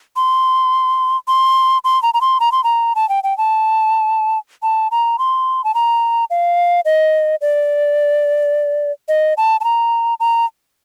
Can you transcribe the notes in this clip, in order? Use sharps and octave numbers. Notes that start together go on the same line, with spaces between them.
C6
C6
C6
A#5
A#5
C6
A#5
C6
A#5
A5
G5
G5
A5
A5
A#5
C6
A5
A#5
F5
D#5
D5
D#5
A5
A5
A#5
A#5